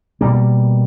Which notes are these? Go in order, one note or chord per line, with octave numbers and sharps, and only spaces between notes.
B2 G3 A#3